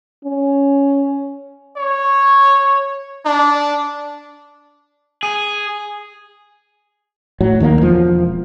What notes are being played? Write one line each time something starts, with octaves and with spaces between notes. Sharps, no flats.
C#4
C#5
D4
G#4
A2 F#3
D#2 D#3 G#3 A#3
E1 F3